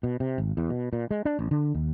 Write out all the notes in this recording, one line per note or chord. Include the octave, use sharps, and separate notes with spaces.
B2
C3
G#1
E2
B2
A#2
G#3
D4
A1
D3
D#2